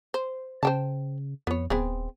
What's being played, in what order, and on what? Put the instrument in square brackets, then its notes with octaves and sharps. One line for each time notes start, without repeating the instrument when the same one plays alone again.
[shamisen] C5
[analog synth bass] C#3 [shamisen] C5 G5 A5
[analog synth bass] F2 [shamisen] B3 C#5
[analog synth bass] D#1 [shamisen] B3 C4 G#4